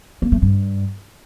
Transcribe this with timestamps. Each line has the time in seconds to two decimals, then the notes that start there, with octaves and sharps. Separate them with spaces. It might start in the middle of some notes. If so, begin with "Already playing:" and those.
0.22 A#3
0.32 A3
0.42 G2